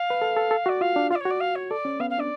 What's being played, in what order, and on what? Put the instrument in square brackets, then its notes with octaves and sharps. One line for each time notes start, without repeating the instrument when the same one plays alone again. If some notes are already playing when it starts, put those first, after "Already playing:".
Already playing: [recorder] F5
[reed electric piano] B4
A4
A4
A4
F#4
[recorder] D5
[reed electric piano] F4 [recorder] F5
[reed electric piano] D4
[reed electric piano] F4 [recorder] F5
[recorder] D5
C#5
[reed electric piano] F#4
[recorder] D5
F5
C#5
[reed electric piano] A4 [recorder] D5
[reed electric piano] C#4
[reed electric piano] B3 [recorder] F5
[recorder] F5
[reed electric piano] D4 [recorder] D5